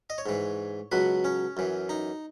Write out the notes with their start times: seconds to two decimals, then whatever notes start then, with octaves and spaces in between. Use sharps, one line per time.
0.10 D#5
0.18 C#5
0.26 G#2 E3
0.92 C#2 B2 F#3 B4
1.24 C#4
1.57 F#2 E3
1.89 D#4